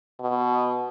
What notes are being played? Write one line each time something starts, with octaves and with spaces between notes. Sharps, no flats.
B2